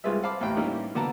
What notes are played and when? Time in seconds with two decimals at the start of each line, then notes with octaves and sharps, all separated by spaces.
0.04 C2 G#3 F4 G#4 B4 E5
0.23 C5 F5 A5 B5 D6
0.40 A1 D#2 A2 F5 G5 B5
0.56 G3 A#3 C#4 D#4 E4 G4
0.95 B2 D3 A#3 B3 A5 A#5